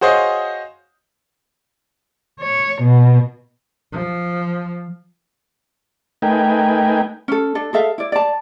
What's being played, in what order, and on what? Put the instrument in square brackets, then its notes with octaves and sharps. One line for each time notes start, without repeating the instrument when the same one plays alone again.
[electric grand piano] F#4 G#4 C5 C#5 D#5 F5
[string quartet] C#5
B2
[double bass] F3
[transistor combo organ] A3 D#4 A#4 B4 G5 G#5
[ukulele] C#4 A4
D4 A4
G#4 A4 E5 F5
E4 D5
D5 A5